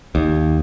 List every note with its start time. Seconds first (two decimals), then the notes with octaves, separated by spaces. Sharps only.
0.15 D#2